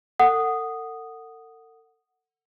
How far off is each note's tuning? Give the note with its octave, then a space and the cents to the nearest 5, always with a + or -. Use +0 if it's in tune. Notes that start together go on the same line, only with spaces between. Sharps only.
A4 +40 F#5 +0 D#6 -5